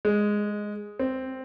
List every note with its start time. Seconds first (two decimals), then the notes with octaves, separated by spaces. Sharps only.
0.05 G#3
0.99 C4